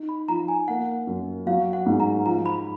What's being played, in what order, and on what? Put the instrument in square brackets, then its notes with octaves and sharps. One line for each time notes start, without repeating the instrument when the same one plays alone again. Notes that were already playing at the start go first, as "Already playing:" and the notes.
Already playing: [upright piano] D#4
[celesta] B5
[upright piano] F3 [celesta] A#5
[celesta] G#5
[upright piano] A#3 [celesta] F#5
[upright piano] F#2
[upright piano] F#3 [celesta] F5
[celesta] F#5
[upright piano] G#2
[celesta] A#5
[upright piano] F3 [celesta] A#5
[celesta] B5